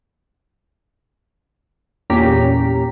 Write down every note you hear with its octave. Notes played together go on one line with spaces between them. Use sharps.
E2 A#2 C#4 G4 A#5 B6